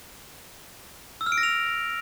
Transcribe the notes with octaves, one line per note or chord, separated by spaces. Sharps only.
E6
F6
D7
A#6
F7